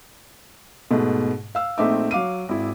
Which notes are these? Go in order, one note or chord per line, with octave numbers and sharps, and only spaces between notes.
G#2 B2 A3
F5 E6
A#1 A3 C4 D#4 E5 D6
F#3 F5 D6 D#7
G#1 E4